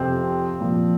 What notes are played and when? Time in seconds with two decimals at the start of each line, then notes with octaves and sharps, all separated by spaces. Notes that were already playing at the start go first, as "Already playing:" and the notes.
Already playing: F2 C3 F3 C4
0.60 A#2 F3